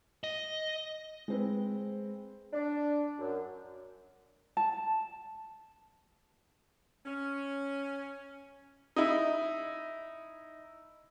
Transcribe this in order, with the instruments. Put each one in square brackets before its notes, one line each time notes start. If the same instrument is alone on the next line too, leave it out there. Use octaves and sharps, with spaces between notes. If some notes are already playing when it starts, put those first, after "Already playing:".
[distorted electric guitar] D#5
[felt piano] G#3 C4 B4
[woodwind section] D4
F#2
[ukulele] A5
[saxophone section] C#4
[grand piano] D#4 E4